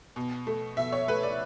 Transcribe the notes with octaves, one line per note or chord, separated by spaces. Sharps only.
B2
A3
B2 E5
C#5
A3 B4
D5